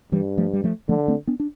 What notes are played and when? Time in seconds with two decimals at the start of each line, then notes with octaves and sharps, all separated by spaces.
0.12 G2 E3 G3
0.38 F3 A3
0.53 G3
0.64 F3 A3
0.89 D3 F3 A3
1.08 A3 C4
1.27 B3 D4
1.40 D4